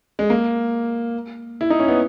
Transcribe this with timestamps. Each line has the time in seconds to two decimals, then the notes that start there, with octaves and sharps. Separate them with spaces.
0.19 G#3
0.30 A#3
1.61 E4
1.70 D#4
1.80 C#4
1.88 B3